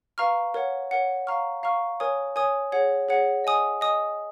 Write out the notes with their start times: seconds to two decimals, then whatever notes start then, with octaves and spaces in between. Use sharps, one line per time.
0.18 B4 F5 A#5 C#6 F6
0.54 A#4 C#5 F#5
0.91 A#4 C#5 F#5
1.27 F5 A#5 C#6 F6
1.63 F5 A#5 C#6 F6
2.00 A#4 C#5 G#5 D#6
2.36 A#4 C#5 G#5 D#6
2.72 G#4 C#5 F#5
3.09 G#4 C#5 F#5
3.44 D#5 G#5 D#6
3.81 D#5 G#5 D#6